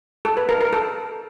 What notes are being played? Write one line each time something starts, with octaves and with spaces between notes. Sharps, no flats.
A4
B4
A#4
A#4
A4